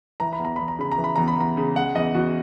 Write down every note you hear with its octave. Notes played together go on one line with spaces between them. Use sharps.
E3 A#5
B5
E2
A#5
E2 B5
A#5
C#3 B5
A#5
E3
B5
E2 A#5
B5
E2 A#5
C#3
G#3 F#5
E2 D#5
E2 F#4